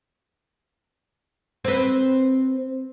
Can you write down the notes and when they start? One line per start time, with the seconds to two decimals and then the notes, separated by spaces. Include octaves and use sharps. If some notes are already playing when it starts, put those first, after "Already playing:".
1.65 C4 B4